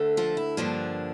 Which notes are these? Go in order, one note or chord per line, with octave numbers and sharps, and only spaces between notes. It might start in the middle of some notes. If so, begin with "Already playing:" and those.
Already playing: D2 D3 A3
F3 F4
E4
G2 D3 F3 A#3 D4